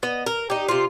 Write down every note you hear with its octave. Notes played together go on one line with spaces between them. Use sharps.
B3 D#5
A#4
D#4 G4
C3 F4